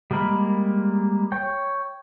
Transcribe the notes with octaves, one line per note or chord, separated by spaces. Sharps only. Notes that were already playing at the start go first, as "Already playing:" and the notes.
G3 G#3 A#3 A#4 B5
C#5 G5